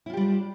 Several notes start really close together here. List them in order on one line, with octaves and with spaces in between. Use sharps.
E4 F4 G4 G3 D4